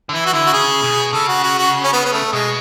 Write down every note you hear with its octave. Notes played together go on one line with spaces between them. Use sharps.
D3
E3 E4
F#4
D3 E4
F#4
C#3 G#4
B2
C#3 A4
F#4
F#4
F#4
C#4
B3
B3
A3
B2 G#3